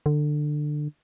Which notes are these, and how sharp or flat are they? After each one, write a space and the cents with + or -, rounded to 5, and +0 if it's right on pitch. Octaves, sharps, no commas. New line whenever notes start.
D3 +20